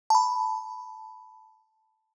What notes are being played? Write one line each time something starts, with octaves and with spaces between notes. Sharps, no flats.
A5 B5